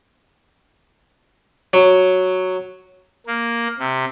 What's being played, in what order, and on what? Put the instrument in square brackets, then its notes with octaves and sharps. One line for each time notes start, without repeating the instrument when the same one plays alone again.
[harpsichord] F#3
[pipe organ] A#3
C3